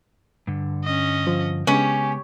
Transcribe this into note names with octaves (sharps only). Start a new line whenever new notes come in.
G2 D3
C#4 D#5
F3
C#3 G#3 B3 C#4 G4